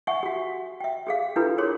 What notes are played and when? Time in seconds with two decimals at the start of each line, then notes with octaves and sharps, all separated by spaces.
0.07 E5 F#5 G#5 C#6
0.23 F#4 G4
0.80 E5 G5
1.07 G4 G#4 F5
1.36 D4 E4 F4 G4 A4 B4
1.58 G#4 A#4 C#5 C6